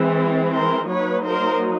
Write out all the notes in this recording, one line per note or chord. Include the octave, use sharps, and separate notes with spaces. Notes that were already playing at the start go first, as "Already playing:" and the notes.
Already playing: E3 G#3 C4
A#4 C5
F#3 A#3 D#4 B4 C#5
A#4 C5